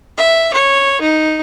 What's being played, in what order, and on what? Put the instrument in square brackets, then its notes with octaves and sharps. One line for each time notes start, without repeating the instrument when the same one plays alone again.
[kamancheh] E5
C#5
D#4